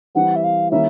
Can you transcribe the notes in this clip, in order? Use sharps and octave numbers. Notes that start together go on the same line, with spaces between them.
E3 G3 C4 F#5
E5
F5
D#3 G3 A#3 C#4 E4 E5